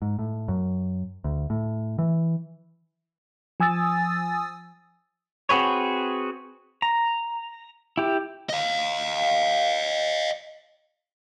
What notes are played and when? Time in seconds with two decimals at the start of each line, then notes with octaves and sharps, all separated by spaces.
0.02 G#2
0.19 A2
0.48 F#2
1.24 D2
1.50 A2
1.99 E3
3.60 F3 G#5 D#6 E6 A6
5.49 C4 F#4 G#4 B4 C#5
6.82 A#5
7.97 E4 G4
8.49 D#5 F5